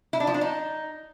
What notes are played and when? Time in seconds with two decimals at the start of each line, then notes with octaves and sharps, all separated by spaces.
0.13 E4
0.20 D4
0.27 F3
0.34 D4
0.41 D#4